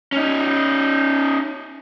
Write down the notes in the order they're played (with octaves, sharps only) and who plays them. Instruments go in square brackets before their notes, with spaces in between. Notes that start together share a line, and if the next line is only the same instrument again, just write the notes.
[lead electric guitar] C#4 D#4